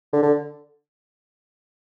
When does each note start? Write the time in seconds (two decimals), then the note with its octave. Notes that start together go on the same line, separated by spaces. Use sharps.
0.13 D3
0.23 D3